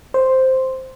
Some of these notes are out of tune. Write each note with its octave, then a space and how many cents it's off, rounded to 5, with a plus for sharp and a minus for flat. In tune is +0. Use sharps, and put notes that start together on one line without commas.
C5 +0